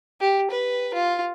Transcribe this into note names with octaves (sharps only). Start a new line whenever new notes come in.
G4
B4
F4